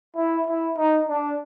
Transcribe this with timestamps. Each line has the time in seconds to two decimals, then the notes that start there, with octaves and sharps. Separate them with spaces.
0.16 E4
0.47 E4
0.77 D#4
1.09 D4